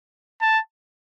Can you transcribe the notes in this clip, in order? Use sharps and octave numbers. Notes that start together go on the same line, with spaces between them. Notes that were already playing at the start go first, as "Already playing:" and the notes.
A5